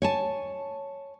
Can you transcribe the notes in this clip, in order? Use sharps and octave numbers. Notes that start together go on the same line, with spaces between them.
C#5 G#5 A5